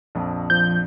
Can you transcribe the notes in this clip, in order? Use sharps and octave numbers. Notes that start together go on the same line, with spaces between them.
A#1 F2
F3 G6